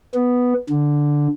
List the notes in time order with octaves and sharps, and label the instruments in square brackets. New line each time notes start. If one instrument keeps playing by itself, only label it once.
[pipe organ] B3
D3